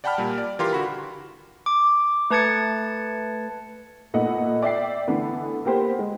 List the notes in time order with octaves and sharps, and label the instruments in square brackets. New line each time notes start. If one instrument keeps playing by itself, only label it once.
[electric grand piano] D5 F#5 G5 A5 B5 F6
A#2 G3
D5
E3 F4 G4 A#4 C6
D3 F#4 B5
[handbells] D6
A3 B4 A5 G#6 A6 C#7
[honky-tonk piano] A#2 A3 B3 D#4 D#5 F#5
D5 E5 G5 C7
D3 E3 A3 B3
A#3 B3 G4 C5
G#3